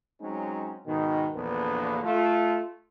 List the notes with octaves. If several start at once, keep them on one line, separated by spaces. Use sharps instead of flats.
F#3 G#3 C4 C#4 D#4
G#2 B2 D#3
A#1 E2 D3 A#3 B3
A3 F4